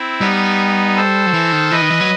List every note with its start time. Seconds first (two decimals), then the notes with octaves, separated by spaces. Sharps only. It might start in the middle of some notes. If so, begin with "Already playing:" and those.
Already playing: C4 E4
0.21 G3 B3 D#4
0.96 A4 C5
1.26 F#3
1.34 E3
1.52 D#3
1.71 E3 B4 D#5
1.81 D#3
1.90 E3
2.00 F#3